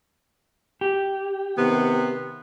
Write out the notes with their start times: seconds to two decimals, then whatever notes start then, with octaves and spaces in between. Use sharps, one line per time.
0.81 G4
1.58 C3 D#3 B3